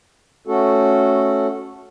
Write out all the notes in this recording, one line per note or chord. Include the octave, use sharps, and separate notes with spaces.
A3 C#4 F#4 A4